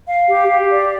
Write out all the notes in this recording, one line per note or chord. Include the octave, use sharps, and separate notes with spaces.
F5
G4
G4
D5